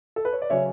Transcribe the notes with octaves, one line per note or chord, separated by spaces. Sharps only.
A4
B4
C#5
D5
C#3 F#3 C#4 C#5 E5